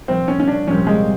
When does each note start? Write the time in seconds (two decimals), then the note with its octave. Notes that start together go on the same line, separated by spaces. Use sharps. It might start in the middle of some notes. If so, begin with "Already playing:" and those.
0.08 C2 A#2 F3 C4
0.28 C#4
0.40 C#4
0.48 D4
0.67 C2 A#2 F3 C#4
0.87 G#3